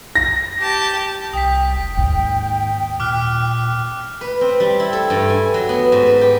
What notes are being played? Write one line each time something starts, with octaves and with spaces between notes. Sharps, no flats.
A#6
G4 A5
C2 G5 D#6 B6
F1
D#2 G#2
A#2 D6 F6 F#6
B4
C4
G3
E4
A4
G2
G#5
F#3
B3
G#2
B4
G4